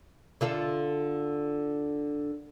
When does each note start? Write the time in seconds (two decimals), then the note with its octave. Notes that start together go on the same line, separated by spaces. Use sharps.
0.41 D3 F4 A4